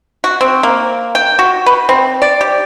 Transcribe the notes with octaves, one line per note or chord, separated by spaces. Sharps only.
F#4
C4
A#3
G5
F#4
B4
C4
D5
G4